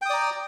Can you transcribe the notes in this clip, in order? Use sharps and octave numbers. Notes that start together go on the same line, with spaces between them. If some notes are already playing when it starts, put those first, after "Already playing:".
D5 G5 A#5 D#6